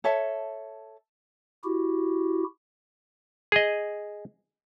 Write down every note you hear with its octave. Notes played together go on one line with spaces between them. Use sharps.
A4 C#5 E5 A5
E4 F#4 G4
G#4 D#5